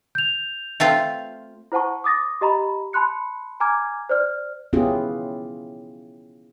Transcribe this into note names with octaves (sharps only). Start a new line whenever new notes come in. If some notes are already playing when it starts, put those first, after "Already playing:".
G6 F7
A3 C4 F4
E4 C5 F#5 A5 C#6
D6 D#6 A6 A#6
G4 D#5 A#5 B5
A5 B5 C6 F#6 C#7
G#5 A#5 D6 F6 G#6
C5 D5 F6
B3 C#4 E4 F4 G4 G#4